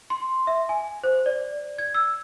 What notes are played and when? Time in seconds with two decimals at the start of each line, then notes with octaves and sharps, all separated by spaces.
0.10 C6
0.47 E5
0.69 G#5
1.04 C5
1.26 D5
1.78 G#6
1.94 E6